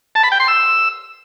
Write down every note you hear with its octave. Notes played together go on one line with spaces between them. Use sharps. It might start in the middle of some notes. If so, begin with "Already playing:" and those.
A5
B5
G5
C6
E6